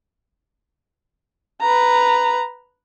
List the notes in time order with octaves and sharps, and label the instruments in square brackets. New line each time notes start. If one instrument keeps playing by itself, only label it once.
[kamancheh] B4 A#5